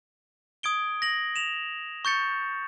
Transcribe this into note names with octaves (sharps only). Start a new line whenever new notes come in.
D#6 G#6 D7 G7
A#6 F#7
E7 F7
C#6 G6 A6 C#7